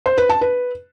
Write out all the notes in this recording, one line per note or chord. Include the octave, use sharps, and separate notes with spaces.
C5
B4
A5
B4